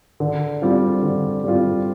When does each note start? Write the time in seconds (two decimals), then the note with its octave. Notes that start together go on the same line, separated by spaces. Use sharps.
0.20 D3
0.62 G3 C4 F4
1.03 D3
1.44 G3 C4 F4